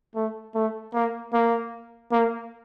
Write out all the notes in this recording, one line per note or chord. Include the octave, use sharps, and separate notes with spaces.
A3
A3
A#3
A#3
A#3